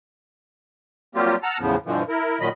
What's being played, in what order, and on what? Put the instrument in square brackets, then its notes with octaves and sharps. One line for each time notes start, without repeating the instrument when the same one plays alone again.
[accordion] F#3 G3 A#3 C4 F4 G4
F#5 A5 A#5 E6 F6
E2 A2 C#3 F3 B3
G2 B2 D3 E3 F3
E4 A#4
A#2 D#3 F#3 D#5 B5